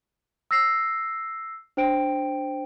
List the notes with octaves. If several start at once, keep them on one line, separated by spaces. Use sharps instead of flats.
E6 A#6 C7
D4 C5 G5 D7